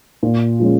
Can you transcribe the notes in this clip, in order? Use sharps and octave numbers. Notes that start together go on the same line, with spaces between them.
A#2
F3 G#3 C#4